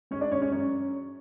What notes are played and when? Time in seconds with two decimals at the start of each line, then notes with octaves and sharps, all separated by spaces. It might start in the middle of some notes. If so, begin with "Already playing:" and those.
0.11 G#2 C#4 C#5
0.21 D4 D5
0.32 G#2 C#4 C#5
0.42 C#4 C#5
0.52 F#2 C#4 C#5